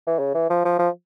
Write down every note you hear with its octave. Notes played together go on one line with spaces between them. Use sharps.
E3
C#3
E3
F3
F3
F3